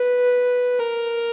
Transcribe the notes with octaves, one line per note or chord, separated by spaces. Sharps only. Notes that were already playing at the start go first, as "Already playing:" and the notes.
Already playing: B4
A#4